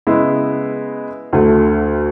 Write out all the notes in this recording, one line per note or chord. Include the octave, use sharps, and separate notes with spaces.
C#3 G#3 B3 E4
D2 D3 A3